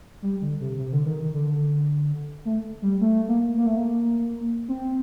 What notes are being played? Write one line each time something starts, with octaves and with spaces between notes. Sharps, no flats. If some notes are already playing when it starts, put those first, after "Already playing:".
G3
D3
C3
C3
D3
D#3
D#3
D3
A3
G3
A3
A#3
A#3
A3
A#3
C4